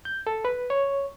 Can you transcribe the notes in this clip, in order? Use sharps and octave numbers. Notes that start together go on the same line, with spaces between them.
G6
A4
B4
C#5